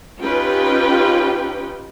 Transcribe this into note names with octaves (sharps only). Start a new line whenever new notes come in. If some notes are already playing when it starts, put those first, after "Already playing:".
C#4 D#4 F4 G4 B4 G5